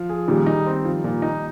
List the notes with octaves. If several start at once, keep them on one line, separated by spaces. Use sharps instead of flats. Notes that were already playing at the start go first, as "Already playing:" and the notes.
Already playing: F3
G#4
A#2 D#3 G3
D#4
C4
F3
A#2
D#4